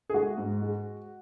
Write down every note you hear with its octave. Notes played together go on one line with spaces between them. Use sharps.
G#4
G#3 F#4
G#2
G#3